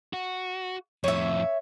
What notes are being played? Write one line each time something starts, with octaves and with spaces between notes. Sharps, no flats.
F#4
F2 A2 C#5 E5